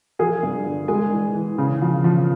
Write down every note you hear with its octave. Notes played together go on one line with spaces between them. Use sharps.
F3 G#4 G#5
G2
D3
G#3 G#4 G#5
E3
E3
C#3
F3
F3